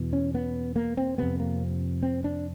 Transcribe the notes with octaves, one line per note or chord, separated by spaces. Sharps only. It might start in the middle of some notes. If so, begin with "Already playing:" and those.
Already playing: E2 B2
C#4
B3
A#3
C4
F2 C3 B3
A#3
C4
D4